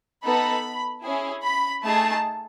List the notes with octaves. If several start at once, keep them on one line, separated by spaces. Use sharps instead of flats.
B3 D#4 A4 B5
C#4 E4 G#4
B5
A3 D#4 G#4 A5